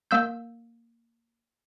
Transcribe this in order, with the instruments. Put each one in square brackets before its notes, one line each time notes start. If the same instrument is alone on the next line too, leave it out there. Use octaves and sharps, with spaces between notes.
[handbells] A#3 E6 G6